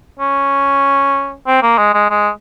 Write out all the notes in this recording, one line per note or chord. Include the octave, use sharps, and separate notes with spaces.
C#4
C4
A#3
G#3
G#3
G#3